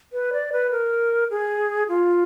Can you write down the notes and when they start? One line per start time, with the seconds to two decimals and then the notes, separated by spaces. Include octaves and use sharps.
0.13 B4
0.33 D5
0.52 B4
0.71 A#4
1.31 G#4
1.89 F4